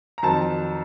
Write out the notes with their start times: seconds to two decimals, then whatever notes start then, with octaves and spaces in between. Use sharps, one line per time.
0.18 A#5
0.23 F2 D#3 F#3 C4 A5